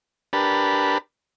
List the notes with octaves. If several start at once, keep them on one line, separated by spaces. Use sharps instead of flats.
D4 G4 A#4 B4 A5 B5